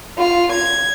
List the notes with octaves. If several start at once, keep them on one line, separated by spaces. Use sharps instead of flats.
F4
G#6